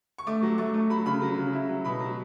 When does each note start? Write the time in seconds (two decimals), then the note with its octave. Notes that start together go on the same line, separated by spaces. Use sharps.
0.18 C#6
0.27 A3 D6
0.42 F#3
0.58 A3 C#6
0.74 A3
0.90 F#3 B5
1.06 C#3 B5
1.22 F#3
1.37 C#3
1.53 E4
1.69 F#3
1.84 B2 B5
2.00 F#3